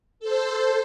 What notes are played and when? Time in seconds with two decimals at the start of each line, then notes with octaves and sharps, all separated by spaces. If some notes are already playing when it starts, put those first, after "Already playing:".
0.20 A4 C5